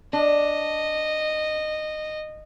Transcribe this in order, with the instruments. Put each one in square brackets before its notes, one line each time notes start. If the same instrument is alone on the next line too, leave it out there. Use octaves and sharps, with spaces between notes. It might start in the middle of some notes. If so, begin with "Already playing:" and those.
[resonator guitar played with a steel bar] D4 [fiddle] D#5